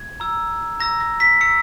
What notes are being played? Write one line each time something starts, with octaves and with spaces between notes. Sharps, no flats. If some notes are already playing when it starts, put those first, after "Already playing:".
Already playing: G#6
A#5 E6
A#5 E6 A#6
A#6
B6
A#5 E6 C#7